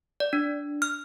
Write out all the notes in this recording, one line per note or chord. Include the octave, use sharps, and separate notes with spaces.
D5
D4
F6